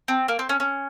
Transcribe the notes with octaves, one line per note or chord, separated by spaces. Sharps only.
C4
A#3
C4
C#4
C#4